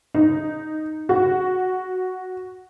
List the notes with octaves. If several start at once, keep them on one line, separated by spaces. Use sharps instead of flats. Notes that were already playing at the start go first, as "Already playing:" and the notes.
D#4
F#4